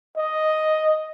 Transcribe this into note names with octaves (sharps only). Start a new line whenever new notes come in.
D#5